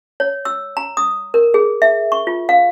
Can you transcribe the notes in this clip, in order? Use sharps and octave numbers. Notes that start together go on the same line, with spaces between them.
C#5
E6
A#5
D#6
A#4
G#4
E5
C#6
F4
F5